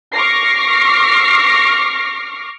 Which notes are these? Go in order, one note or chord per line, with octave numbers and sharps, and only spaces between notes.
C#6 D6 F6 A#6 C7